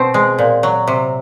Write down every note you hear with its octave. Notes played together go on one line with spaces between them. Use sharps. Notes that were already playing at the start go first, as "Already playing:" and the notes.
Already playing: B2 C4
G#3
A#2
F#3
C3